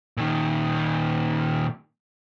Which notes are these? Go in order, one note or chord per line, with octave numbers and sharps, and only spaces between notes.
A#2 D#3